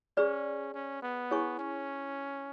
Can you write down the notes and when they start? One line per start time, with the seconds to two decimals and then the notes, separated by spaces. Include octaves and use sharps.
0.17 C#4 G#4 B4 D5
0.74 C#4
1.02 B3
1.31 E4 G#4 C#5 G#5 C#6
1.59 C#4